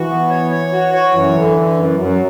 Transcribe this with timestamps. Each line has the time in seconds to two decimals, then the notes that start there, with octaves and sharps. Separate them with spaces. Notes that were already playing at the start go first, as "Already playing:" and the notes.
Already playing: E3 F#4
0.10 B3
0.30 C#5
0.51 C#5
0.72 F#4
0.94 C#5
1.14 F#2 E3
1.36 D3
1.57 D3
1.78 F#2
1.99 F#2 F#3